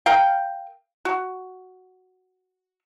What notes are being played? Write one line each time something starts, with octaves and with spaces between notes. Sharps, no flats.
A#4 F5 G5
F#4